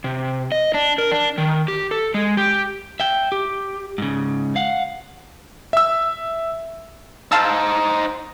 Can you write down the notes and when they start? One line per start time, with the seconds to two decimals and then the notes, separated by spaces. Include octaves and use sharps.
0.04 C3
0.52 D#5
0.74 D4
0.98 A#4
1.11 D4
1.38 D#3
1.68 G4
1.91 A4
2.14 G#3
2.37 G4
3.00 E5 G5
3.32 G4
3.98 G#2 C#3
4.56 F5 F#5
5.73 E5 E6
7.32 D#4 C5 F5 A5 E6